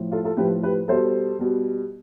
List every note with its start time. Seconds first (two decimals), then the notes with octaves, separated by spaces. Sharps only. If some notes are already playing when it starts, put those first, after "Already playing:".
Already playing: A2 F3
0.11 F4 A4
0.24 F4 A4
0.37 A2 F3 G4 B4
0.63 G4 B4
0.88 B2 G3 A4 C5
1.39 B2 G3